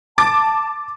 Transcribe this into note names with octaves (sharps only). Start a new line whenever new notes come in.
A5 D6 A6